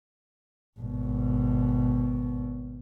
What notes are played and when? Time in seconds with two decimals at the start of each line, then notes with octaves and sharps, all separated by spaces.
0.79 G#1 B2